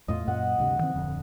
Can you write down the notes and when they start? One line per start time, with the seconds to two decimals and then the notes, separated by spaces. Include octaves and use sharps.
0.08 E2 A2 A3 F4 D#5
0.28 F#2 A#2 F#5
0.59 D2 G2 C3
0.79 D#3 E3 C4
0.94 D1 F2 D3